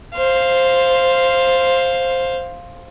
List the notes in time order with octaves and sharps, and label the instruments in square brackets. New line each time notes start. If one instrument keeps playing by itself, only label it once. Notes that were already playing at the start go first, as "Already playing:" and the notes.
[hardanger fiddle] C5 F5